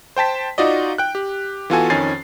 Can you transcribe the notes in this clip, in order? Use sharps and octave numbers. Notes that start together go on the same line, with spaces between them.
C5 G5 A5 B6
D#4 F4 F#4 D5 D#5
G5 F#6
G4
E3 B3 F4 F#4 A4 G#5
F2 D#3 C#4 G#5 A6 C7